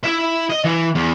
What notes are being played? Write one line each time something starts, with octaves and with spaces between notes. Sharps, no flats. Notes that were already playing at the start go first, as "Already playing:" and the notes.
E4 E5
D#5
E3
E2